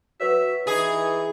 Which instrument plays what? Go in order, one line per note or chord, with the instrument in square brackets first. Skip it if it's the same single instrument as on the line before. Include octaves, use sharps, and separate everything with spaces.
[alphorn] F#4 [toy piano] B4 C#5 [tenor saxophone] E5
[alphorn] E3 [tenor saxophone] D#4 [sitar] G#4